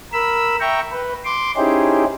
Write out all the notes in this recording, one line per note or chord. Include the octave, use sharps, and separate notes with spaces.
A#4 B5 E6
E5 G5 A#5 C#6
B4
C6 D6
C#4 D#4 E4 G4 G#4 C5